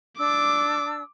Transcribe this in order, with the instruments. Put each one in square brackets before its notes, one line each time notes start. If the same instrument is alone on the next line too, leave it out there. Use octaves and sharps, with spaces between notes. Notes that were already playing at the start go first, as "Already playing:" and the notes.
[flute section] D4 A5 E6 [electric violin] D6